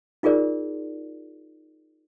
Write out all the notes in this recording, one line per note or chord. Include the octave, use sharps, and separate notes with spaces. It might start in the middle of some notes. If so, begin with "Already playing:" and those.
D#4 F4 G#4 A#4 D5